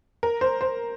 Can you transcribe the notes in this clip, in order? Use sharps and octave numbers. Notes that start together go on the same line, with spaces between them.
A#4
C5
C5